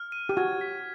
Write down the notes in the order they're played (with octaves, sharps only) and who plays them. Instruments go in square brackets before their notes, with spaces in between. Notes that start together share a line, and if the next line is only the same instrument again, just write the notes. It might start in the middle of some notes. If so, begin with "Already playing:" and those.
Already playing: [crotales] F6
D#7
[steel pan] G4
[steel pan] F#4 [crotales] G#6
[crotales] B6